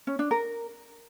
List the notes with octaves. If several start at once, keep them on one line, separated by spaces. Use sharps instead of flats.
C#4
D4
A#4